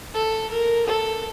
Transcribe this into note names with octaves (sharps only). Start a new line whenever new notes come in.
A4
A#4
A4